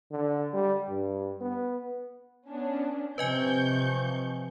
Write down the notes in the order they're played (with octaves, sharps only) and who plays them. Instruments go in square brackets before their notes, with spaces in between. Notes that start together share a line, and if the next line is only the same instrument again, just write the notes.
[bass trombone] D3
G3
G2
B3
[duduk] B3 [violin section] C#4 D4
[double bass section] C3 [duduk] F3 [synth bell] B4 D#5 G#5 [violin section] C#6 G6